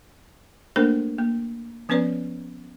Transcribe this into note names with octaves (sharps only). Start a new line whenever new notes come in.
A3 A#3 D4 A4 A#4 C5
A#3
F3 B3 C#4 B4 C#5 D5